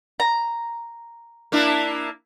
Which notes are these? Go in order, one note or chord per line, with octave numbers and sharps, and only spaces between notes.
A#5
A#3 D4 E4